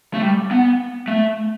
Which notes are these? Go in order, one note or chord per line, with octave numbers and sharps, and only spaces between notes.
A3
G3
B3
A3